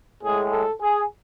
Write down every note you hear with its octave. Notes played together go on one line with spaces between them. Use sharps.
A2 G#3 G#4
A4
G#4